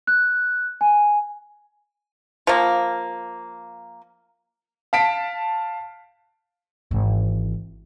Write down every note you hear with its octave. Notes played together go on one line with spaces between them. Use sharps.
F#6
G#5
F3 A#3
F5 A5 B6 D7
G#1 E3